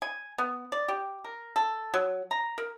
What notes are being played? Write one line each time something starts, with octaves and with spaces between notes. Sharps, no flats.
G#5
B3
D5
G4
A#4
A4
F#3
A#5
A#4